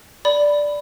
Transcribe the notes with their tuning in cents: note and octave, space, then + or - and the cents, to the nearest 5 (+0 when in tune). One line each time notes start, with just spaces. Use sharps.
D5 +0 B5 +5